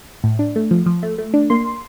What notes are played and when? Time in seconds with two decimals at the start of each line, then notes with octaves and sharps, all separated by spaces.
0.24 A2
0.39 D4
0.56 A3
0.71 F3
0.86 F3
1.03 A3
1.18 A3
1.34 D4
1.50 A#3 C6